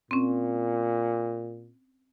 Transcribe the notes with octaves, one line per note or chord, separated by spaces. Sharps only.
A#2 C4 C#4